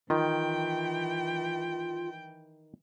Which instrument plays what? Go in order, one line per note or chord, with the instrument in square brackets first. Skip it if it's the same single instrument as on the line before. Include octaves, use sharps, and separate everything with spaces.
[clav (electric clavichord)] D#3 [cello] E3 G5 [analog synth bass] F4